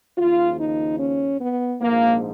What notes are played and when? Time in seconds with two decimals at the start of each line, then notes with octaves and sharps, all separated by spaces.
0.18 D#2 C#3 F3 F4
0.58 D#4
0.99 C#4
1.40 B3
1.81 A#1 G#2 F3 A#3